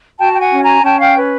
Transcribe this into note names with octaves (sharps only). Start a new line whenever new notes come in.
F#4 G5 A5
G5
F#5 G#5
C#4
G#5 A#5
C#4 G5 A5
F5 G5
B4